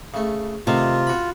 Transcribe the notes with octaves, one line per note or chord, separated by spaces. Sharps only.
C#3 A3
C3 D#3 A3 F4
F#4 B5